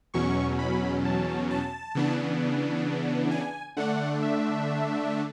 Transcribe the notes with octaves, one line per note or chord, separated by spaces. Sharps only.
E2 B2 F#3 C#4 C#6
B5
A5
A5
C#3 E3 B3 D4
G#5
D3 A3 D4 F#5
E5